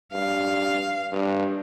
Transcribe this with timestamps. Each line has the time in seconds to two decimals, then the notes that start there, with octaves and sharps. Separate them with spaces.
0.13 G2 F5
1.12 G2